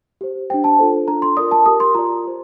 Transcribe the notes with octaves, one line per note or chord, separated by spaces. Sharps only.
G4 C5
D4 G4 C5 G5
A5
D4 F4 A4 C5
D4 F4 A4 A#5
C6
F4 A#4 D5 D#6
A5
G4 A#4 D5 D#6
C6
F4 A#4 D5 A#5
G4 C5